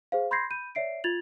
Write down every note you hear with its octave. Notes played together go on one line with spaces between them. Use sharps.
G#4 C5 F5
B5 C6 G6 G#6 A#6 C7
B5 G6 D#7
C#5 D5 E5 C7 D7
F4 G#6 A6 F7 F#7